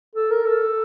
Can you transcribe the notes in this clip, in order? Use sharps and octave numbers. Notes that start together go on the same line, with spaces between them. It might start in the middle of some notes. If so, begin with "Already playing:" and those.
A4
A#4
A4